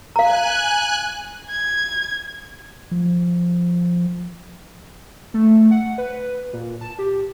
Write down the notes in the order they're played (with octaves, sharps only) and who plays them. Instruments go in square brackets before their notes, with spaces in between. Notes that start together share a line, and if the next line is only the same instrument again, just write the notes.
[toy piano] F5 A#5 [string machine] G#5 F#6
[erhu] G#6
[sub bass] F3
[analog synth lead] A3
F#5
B4
A#2
A5
G4